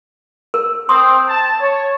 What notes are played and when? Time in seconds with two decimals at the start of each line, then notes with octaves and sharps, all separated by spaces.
0.54 A#4
0.89 C4 C6 D#6
1.28 A5
1.59 C#5